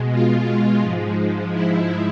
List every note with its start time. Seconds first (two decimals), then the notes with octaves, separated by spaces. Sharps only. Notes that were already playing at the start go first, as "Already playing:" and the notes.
Already playing: B2 G#3
0.11 F4
0.81 G#2 F3 G#3
1.52 E4